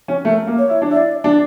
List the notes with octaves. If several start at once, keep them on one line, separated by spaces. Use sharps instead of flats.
C#4
A3 A#4
A#3
C#5
E4
D4
E4 D5
D4 D5